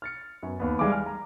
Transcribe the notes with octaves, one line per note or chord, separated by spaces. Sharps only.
F6 A6 C#7
F#2 B3
D#2 B3
G3 G#3 E4 F5 D6
G#5 F6
A#5